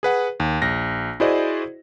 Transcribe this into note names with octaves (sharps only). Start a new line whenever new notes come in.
G#4 B4 F#5
D#2
A#1 A#6
E4 F#4 G#4 C5 D5 D#5